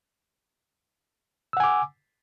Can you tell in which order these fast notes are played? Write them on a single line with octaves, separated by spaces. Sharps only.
E6 F#5 G#5 D6